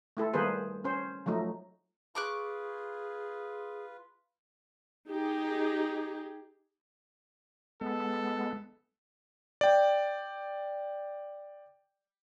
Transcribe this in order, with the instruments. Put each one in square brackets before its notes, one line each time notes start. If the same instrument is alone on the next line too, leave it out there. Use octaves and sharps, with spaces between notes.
[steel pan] A3 E4 A4
D#3 G3 A#3 G#4 B4 C5
C#4 C5
F3 F#3 A3 D#4
[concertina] F4 B4 [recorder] G#4 [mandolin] C#6 D6 F#6
[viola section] D#4 G4 G#4
[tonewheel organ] G#3 B3 [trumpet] A4
[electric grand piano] D5 G5